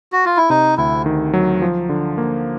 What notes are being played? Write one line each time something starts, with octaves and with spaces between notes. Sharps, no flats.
F#4
F4
E4
C3 D#4
D2 E4
D#3
F#3
F3
D3
A#3